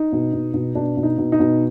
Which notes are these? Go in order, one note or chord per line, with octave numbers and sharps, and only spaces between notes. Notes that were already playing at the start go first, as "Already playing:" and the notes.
Already playing: D#4
B2
B2
B2
B2 D4
B2
D#4
B2
D#4
B2